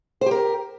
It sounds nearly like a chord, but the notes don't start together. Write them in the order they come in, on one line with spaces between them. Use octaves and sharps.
C5 G4 A#4